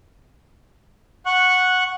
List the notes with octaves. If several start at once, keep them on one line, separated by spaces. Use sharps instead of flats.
F#5 C#6 F#6